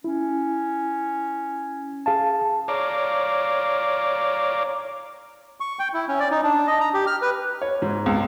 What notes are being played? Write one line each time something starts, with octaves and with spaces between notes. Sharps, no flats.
C#4 E4
G#4 F5 A5
C#5 D5 F5 A#5 D6
C#6
G5
E4
C#4
D5
D#4
D4
D#5
A#5
G4
F6
B4
C#5
G#2
C#2